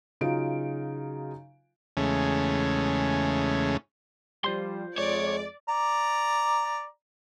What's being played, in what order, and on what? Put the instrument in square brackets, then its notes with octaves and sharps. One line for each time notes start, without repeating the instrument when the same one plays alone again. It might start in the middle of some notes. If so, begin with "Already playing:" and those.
[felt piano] C#3 F#3 D#4 F4 D7
[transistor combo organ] E2 C#3 G#3 A3 C#4
[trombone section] F3 G3 [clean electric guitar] F4 C5 C6
[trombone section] F2 G#3 [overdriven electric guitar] C#5 [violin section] D5
[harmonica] D5 A#5